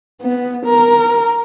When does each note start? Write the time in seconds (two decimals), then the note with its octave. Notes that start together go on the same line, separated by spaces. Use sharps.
0.22 B3
0.66 A#4